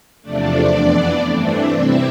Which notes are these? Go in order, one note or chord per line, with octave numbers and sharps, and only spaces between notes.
E2 C3 F3 A3 D4 D5
F2 E3 B3
G2 E3 A3 C4 D4 D5
C3 G3 C4 E4 E5